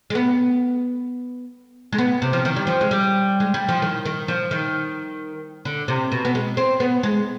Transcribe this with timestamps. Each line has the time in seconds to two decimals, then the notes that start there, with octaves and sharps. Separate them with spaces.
0.10 G#3
0.15 B3
1.93 G#3
1.98 B3
2.22 C3
2.33 F3
2.45 D#3
2.56 G3
2.67 F3
2.81 G#3
2.91 G3
3.40 G#3
3.54 G3
3.68 F3
3.82 D#3
4.05 D#3
4.28 F3
4.51 D#3
5.65 D3
5.88 C3
6.12 B2
6.25 B3
6.35 G#3
6.57 C4
6.80 B3
7.03 G#3